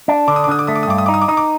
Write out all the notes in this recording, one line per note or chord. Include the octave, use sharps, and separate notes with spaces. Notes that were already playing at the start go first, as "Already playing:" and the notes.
D4
D3 D6
D#6
D6
D3 D#6
D6
A3 D#6
D6
D#6
G2 D6
D#6
D#4 D6
D#6
D6
D#4 D#6
D6